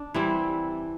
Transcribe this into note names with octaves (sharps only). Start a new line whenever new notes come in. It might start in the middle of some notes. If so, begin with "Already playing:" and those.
Already playing: D4
E3 G3 C4 E4